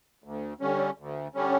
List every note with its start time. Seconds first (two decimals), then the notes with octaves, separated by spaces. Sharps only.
0.24 D2
0.61 D3 G3 C#4
0.98 D2
1.35 D3 G3 C#4